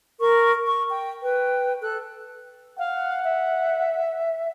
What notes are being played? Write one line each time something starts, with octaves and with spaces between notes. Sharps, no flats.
A#4 C#6
C#6
G5
B4 G5
A4 F#6
F5 F#5
E5